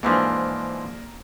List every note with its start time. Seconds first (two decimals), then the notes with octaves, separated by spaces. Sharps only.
0.03 G#2 E3 F3 A#3 D4